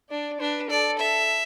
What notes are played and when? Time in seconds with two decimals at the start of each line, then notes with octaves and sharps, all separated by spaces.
0.10 D4 D5
0.40 D4 B4
0.69 A4 D5
0.99 E5